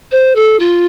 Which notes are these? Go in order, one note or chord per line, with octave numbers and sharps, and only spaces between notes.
C5
A4
F4